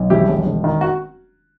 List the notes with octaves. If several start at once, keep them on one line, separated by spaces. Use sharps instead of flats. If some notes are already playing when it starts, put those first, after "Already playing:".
Already playing: B1
E1 E4 G4
E1
E1
D#3
F#4